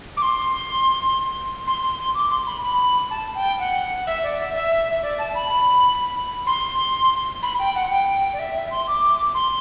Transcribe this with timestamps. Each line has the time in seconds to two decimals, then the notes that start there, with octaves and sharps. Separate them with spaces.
0.17 D6
0.22 C6
1.67 C6
1.83 C6
1.99 C6
2.15 D6
2.31 C6
2.47 B5
2.62 B5
3.11 A5
3.35 G5
3.59 F#5
4.07 E5
4.23 D5
4.39 E5
4.55 E5
5.03 D5
5.19 A5
5.35 B5
6.47 C6
7.43 B5
7.59 G5
7.75 F#5
7.91 G5
8.33 D5
8.39 E5
8.55 E5
8.71 C6
8.88 D6
9.35 C6